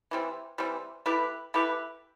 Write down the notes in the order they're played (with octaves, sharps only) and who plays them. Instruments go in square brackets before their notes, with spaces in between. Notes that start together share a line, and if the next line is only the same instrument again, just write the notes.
[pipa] E3 G3 C4
E3 G3 C4
A3 E4 G4 B4
A3 E4 G4 B4